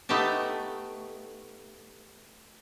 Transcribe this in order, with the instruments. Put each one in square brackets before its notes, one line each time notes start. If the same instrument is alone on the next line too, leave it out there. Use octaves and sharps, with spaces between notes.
[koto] A3 B3 D#4 G4 A5